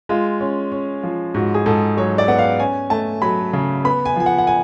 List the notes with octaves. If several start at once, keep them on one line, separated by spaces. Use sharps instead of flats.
G#3 F4
C#4
C#4
F3
G#2 F#4
G#4
G#2 A4
F#3 C#5
D5
B3 F#5
F5
C#4 G#5
A3 A5
F#3 B5
C#3
B3 B5
G#5
F3 G#5
F#5
F#5
G#5